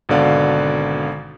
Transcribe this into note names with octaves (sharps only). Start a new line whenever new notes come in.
G#1 B2 D3 D5 F5 F#5